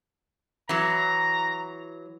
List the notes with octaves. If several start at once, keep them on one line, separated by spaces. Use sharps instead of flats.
E3 F#3 A#5